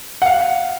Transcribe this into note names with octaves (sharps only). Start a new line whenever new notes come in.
F#5
F5